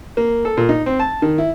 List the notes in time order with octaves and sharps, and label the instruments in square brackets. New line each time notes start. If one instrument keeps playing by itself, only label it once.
[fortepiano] A#3
A4
A#2
D#4
C4
A5
D#3
E4